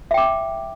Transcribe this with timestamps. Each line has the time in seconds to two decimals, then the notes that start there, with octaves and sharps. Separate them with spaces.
0.11 E5
0.14 G5
0.18 D6